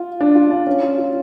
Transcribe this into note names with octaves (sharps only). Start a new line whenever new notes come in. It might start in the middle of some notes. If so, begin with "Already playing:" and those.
Already playing: F4
D4
F4
D4
C#4
F4
F4